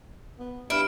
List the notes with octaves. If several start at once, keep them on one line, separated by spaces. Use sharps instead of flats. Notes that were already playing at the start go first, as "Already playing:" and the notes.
B3
G2 E4 F6 D7